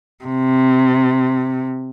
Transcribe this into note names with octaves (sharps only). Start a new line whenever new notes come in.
C3